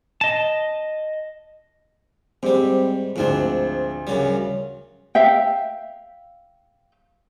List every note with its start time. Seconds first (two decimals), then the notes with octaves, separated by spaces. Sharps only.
0.21 D#5 A5
2.43 G#2 G3 C4 G4
3.16 D2 G#2 F3 C4 D4
4.07 F#2 C#3 G3
5.15 E5 F5 G5